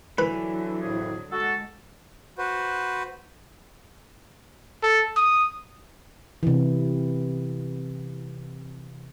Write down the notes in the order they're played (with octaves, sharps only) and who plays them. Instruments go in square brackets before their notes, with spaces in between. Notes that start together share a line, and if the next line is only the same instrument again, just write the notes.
[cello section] D3 F#3 [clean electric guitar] E3 [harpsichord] B4
[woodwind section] F2 A2 G#4
[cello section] G#3 [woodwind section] F#4 A4
[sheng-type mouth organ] F#4 B4 C5
[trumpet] A4
D#6
[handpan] C3 E3